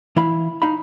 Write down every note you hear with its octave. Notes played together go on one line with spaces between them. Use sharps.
E3 E4 F5 B5
D#4 F5 B5